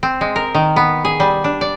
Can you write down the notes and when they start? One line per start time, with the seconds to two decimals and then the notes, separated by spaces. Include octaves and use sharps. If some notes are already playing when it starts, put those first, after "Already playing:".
0.03 C4
0.21 G#3
0.36 A#4
0.55 D#3
0.76 B3
1.05 G#4
1.20 G3
1.44 D4
1.61 D5